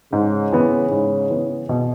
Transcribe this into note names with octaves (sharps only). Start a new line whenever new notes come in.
G#2 C#3
E3 B3
G#2
E3 B3
B2